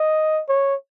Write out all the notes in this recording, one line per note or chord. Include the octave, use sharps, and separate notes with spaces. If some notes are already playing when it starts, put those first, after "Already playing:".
Already playing: D#5
C#5